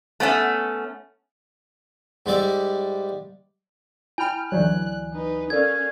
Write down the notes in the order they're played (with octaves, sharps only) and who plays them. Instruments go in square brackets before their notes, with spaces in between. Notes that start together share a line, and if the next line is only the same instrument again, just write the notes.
[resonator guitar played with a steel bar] A3 B3 C#4 E5
[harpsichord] G#2 G3 D5 E5
[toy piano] E4 B5 [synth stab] G5 F6 [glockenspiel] G#5
[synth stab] D2 E3 F#3 [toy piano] C#5 D5 [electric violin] F#6
[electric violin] D#4 B4
[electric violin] C#4 F5 [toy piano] A4 A#4 D5 [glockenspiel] G#6